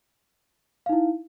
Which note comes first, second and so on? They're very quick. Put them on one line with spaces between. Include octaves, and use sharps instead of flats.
F5 D#4 E4